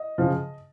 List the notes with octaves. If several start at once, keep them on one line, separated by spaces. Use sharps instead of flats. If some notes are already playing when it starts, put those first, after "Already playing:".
Already playing: D#5
C#3 F3